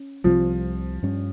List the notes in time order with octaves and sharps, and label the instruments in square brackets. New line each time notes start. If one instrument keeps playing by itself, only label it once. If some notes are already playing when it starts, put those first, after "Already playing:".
Already playing: [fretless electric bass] C#4
[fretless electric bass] C2 C3 G3 C4 [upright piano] F3
[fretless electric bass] G2 G3 C#4